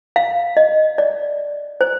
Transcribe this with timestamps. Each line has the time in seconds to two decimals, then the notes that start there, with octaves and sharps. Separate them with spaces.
0.16 F5
0.57 D#5
0.98 D5
1.81 C5